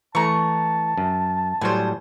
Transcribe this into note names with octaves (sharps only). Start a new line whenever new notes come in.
E3 A3 A5 A#5 C#6
F#2
A2 F#3 G3 C5 G#5